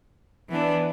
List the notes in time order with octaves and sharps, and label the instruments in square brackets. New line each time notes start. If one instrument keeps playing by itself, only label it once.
[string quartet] E3 B3 D4